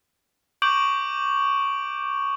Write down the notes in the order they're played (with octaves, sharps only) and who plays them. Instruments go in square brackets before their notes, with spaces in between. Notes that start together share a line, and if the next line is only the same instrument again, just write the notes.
[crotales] C#6 D6 G6 D7 F#7